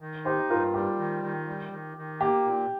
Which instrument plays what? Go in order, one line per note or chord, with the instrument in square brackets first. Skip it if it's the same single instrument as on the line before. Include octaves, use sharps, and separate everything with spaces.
[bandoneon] D#3
[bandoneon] D#4 [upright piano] G4 C5
[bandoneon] G2 [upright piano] F4 A#4
[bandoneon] G3 [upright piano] G4
[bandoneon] D#3
D#3
G3
D#3
D#3
[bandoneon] A#3 [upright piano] G4
[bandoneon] A#2